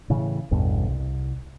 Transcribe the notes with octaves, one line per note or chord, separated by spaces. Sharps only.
A2 C#3 E3
A1 E2 G2 B2
C2